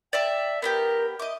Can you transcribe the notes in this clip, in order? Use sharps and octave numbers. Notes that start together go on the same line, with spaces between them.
D5 E5 G5 A5
B3 D4 G4 A#4
D#5 E5 D6